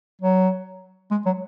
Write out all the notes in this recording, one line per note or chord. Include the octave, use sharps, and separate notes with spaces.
F#3
G#3
F#3